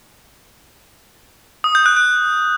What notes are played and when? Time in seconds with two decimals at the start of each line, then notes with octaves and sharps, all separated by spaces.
1.64 D#6
1.75 G6
1.86 F#6
1.97 F#6